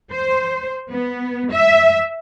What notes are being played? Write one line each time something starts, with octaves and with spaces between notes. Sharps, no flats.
C5
B3
E5